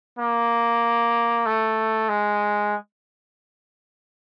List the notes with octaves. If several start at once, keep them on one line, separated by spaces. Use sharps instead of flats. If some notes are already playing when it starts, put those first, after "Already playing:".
A#3
A3
G#3